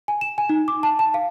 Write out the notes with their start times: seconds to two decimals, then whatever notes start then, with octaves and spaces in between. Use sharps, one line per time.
0.08 G#5
0.21 E7
0.38 G#5
0.49 D#4
0.68 D6
0.83 A5
0.99 A5
1.14 F5